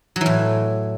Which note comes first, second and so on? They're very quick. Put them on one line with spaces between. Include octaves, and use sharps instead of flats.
F#3 E3 A2